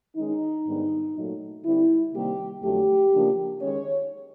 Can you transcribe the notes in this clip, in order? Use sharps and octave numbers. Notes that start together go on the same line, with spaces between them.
D#3 G#3 C#4 D#4
G#2 D#3 G3 B3 D4
A#2 F#3 A3
D3 G3 C4 E4
C3 D#3 G3 A#3 G4
F2 D3 F#3 A3 G4
C#3 F3 A#3 D4
D#3 G#3 C#4 C#5